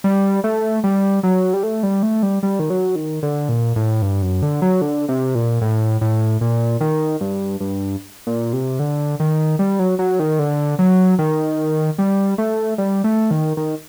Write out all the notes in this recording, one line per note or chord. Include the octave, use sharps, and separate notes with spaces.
G3
A3
G3
F#3
G3
A3
G3
A3
G3
G3
D#3
F#3
D#3
D3
A#2
A2
G2
F#2
D3
F#3
D3
C3
A#2
A2
A2
A#2
D#3
G2
G2
A#2
C3
D3
D#3
G3
F#3
F#3
D#3
D3
F#3
D#3
G3
A3
G3
A3
D#3
D#3